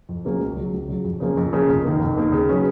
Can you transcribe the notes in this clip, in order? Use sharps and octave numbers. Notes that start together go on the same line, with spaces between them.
F2
C#3 F#3 A#3 C#4
C#2
C#3 F#3
C#2
C#3 F#3
F2
C#3 F3 A#3 C#4
F2
C#3 F3 A#3 C#4
F1
D#2 D#3 A#3
F1
D#2 D#3 A#3
C#3
F#3 C#4 G#4 B4